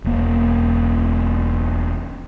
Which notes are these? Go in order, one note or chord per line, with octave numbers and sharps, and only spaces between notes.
E1 A#3